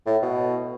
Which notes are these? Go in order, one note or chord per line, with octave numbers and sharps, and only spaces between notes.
A2
B2